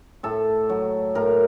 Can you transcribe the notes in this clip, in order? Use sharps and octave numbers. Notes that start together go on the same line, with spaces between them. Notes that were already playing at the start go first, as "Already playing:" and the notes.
A2 A4
F#3
A2 A#4